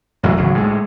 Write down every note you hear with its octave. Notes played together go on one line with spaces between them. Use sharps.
A1 F2 E3 F#3
G#1 C#2 F#3
A2 G#3